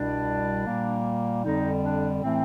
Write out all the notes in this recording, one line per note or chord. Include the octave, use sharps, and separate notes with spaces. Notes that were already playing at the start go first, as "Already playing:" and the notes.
Already playing: C2 B2 G3 D4
A#2 G3 A#3
F2 D3 G3 D#4
D4
A2 E3 A3 C4